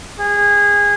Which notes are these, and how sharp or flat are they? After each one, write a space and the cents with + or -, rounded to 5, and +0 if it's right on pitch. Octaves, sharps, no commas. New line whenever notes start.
G#4 -20